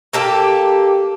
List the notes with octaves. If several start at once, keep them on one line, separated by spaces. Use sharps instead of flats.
A#3 G4 A4